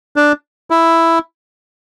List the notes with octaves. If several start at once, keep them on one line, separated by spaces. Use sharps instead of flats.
D4
E4